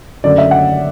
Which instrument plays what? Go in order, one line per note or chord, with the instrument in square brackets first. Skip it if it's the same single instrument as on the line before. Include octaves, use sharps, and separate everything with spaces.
[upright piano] F#1 F#2 D3 F#3 A3 D5
E5
F#5